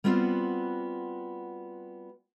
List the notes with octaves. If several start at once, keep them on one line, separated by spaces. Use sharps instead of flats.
G3 B3 C4 F4 F#4